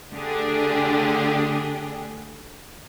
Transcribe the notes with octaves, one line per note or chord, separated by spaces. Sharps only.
D3 A3 D4 G4 G#4